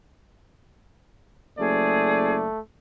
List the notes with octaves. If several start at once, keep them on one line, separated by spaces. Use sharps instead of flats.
F#1 A3 G#4 D5